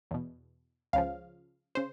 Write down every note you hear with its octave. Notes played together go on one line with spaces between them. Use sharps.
E2 B2
C#2 C#3 F3 F5
C#3 C5